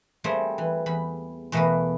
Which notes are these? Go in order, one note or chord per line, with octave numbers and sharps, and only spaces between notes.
G3 A3 A#3 C4 G#4
E3
E2 B5
E2 B2 A3 A#3 A#4 B4